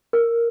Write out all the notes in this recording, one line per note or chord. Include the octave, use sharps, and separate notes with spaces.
A#4